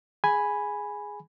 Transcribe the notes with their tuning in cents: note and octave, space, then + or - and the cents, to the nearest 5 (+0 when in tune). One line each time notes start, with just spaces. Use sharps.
G#4 +0 G#5 +0 B5 +0